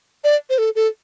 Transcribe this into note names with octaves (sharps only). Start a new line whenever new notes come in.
D5
C5
A4
A4